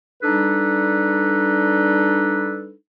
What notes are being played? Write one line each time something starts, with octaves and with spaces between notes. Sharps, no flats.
G3 D4 D#4 A4 B4